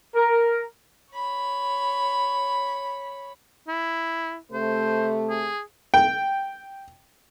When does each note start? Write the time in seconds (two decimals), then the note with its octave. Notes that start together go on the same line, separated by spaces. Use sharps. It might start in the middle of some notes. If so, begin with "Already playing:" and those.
0.14 A#4
1.13 C#5 B5
3.67 E4
4.52 C3 A3 C5
5.29 G#4
5.94 G5